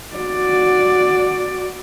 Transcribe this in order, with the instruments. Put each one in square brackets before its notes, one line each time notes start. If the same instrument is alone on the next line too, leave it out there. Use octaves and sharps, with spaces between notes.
[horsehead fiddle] F#4 D5